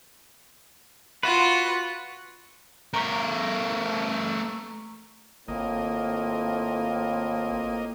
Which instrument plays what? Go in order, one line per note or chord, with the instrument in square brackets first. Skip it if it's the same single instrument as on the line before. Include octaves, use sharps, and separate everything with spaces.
[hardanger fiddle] F4 F#5 [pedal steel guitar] F#4 B4
[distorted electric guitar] A3 A#4 [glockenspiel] A#5 C#6 B6
[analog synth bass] G#1 [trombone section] A2 C4 F4 [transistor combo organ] A#3 D#5